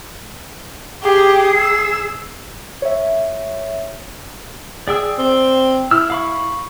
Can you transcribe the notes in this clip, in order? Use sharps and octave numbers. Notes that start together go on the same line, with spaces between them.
G4 G#4
E6
C#5 E5
G#4 D5 G5 E6
C4
E4 E6 F6
F5 B5 C#6